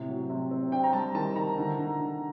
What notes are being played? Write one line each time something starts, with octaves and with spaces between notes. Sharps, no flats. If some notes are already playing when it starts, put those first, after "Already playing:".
Already playing: A2 C3
F#3
C3
C4
D4 G5
A#5
G3 A5
D#3 A5
D#3 A#5
D3
D3
D3